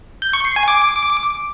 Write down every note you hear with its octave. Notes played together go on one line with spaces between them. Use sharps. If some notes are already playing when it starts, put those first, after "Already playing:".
G6
C#6
C7
G#5
D6